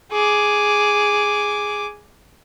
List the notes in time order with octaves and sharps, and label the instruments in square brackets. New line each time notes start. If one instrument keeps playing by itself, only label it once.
[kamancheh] G#4 D6